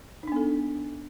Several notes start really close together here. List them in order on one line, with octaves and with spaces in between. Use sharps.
D#4 D4 B3 A4